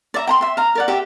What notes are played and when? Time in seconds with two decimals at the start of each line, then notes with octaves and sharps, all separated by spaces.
0.14 D5 E5 A#5
0.27 G5 A#5 C6
0.41 E5 C6
0.57 F5 A#5
0.75 A#4 D5 F#5
0.88 G4 E5 G5